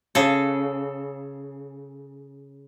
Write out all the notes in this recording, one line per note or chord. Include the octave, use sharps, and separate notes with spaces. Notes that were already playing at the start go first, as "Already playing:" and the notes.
C#3 A4